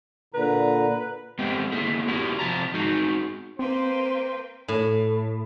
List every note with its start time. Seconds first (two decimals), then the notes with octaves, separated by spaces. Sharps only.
0.34 A#2 D3 B4 A#5
1.39 G#3 B3 C4 G4
1.72 A#3 B3 E4 G#4
2.08 B3 E4 F#4 G4 B4
2.39 C3 F3 A5 A#5
2.74 G#3 D#4 F#4 G#4
3.59 A#3 C4 B4 C5 G5 C6
4.68 A2